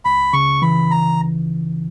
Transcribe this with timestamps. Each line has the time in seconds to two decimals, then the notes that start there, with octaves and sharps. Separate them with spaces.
0.05 C#2 B5
0.33 C#3 C#6
0.62 E3 B5
0.91 A#5